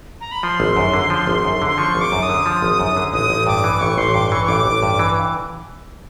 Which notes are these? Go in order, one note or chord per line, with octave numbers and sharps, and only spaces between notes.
A#5
B5
F3 C6
G#1
F#2
D3
F3
G#1
F#2
D3
C6
F3 C#6
G#1
D6
F#2
D#6
D3
F3
G#1
F#2
D3
A1 D#6
A1
G2 D6
E3
A1 C#6
A1 C6
G2 D6
C6
E3 C#6
C#6
A1 D6
A1
G2
E3